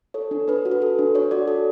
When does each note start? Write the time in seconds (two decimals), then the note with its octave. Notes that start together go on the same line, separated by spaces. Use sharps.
0.14 A4 C#5
0.31 D4
0.48 D4 B4
0.65 F#4
0.71 B4
0.82 A4
0.99 D4
1.15 D4 C#5
1.31 F#4 D5
1.48 A4